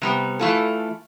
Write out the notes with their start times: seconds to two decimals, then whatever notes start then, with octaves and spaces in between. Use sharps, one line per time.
0.02 C3 G3 B3
0.39 E3 A3 F4 A4